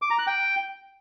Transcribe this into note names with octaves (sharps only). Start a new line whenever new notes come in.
D6
A#5
F#6
G5